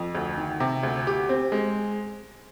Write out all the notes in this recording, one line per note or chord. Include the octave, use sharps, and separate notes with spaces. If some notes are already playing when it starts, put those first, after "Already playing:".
Already playing: F2
D2
D#3
C3
D2
G4
C4
G#3